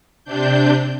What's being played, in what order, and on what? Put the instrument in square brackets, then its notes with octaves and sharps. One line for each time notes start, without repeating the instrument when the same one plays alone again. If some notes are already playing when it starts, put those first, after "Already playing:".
[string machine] C3 D4 G6